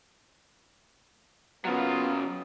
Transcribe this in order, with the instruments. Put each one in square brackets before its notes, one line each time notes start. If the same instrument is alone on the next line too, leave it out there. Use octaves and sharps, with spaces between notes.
[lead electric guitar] C#3 F#3 [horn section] B3 F4